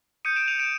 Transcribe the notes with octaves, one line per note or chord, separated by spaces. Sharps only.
D#6 G6 C#7 D#7
D7 E7
D#7 F7
D7 E7